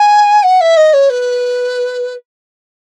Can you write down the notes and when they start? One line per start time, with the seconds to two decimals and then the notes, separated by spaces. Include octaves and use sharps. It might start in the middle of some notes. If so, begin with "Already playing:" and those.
Already playing: G#5
0.43 F#5
0.61 E5
0.77 D#5
0.93 C#5
1.10 B4